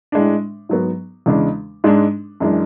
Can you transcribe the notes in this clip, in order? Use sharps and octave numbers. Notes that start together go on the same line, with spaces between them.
A2 G#3 D4
G#2 F#3 B3
E2 C#3 G#3 D4
G#2 G#3 D4
F#2 E3 G#3 D4